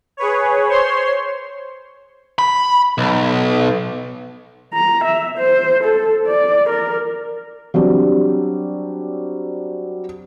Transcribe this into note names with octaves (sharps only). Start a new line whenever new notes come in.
G#4 B4 C#5
C5 C#5 C6
B5
B1
A#5
E5
C5
A4
D5
A#4
F#3 G3 C4 D4